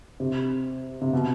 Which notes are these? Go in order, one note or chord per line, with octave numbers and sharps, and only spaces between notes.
C3
C3
B2